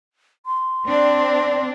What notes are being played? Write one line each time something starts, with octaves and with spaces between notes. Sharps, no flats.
C6
C4 D4 D5